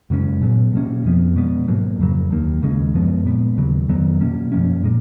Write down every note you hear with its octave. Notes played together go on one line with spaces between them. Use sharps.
F#2 C#3 G#3 C#4
A#2 F#3 B3
B2 A#3 C#4
F2 F3 B3
B2 G#3 B3
G#2 F#3 A#3
F2 C#3 F#3
D#2 D#3 A#3
D#2 C#3 G#3 C#4
F#2 F3 G#3 B3
A#2 G#3 B3
D#2 C#3 F#3
F2 D#3 F#3 B3
B2 A#3 C#4
F#2 F3 A#3 C#4
A#2 G#3